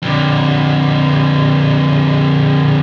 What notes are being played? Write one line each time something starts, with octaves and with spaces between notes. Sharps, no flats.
F2 D3